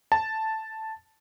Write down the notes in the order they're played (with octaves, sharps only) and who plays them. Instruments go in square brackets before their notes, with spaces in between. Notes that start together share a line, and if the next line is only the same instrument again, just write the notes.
[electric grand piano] A5